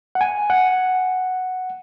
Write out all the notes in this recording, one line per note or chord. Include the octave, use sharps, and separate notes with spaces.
F#5
G#5
F#5